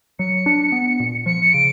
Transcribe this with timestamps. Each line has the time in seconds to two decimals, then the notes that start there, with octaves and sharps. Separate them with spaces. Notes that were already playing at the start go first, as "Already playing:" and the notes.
0.19 F#3 C#7
0.46 D4
0.72 B3
1.00 A#2
1.26 F3 C#7
1.53 C#3 D7